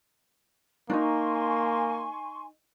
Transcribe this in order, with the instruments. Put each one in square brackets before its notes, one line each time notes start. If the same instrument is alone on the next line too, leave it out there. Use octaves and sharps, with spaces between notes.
[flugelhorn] A#3 [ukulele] D4 D#4 [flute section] G#5 C6 C#6